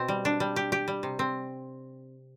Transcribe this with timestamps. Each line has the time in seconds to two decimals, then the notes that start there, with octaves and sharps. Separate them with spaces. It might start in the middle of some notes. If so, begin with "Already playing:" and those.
Already playing: B2 C4
0.08 G3
0.25 D4
0.40 G3
0.56 G4
0.72 G4
0.88 G3
1.03 C3
1.19 C4